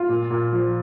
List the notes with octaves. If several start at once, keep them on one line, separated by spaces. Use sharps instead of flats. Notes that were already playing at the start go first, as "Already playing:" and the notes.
Already playing: F4
A#2
A#2
F3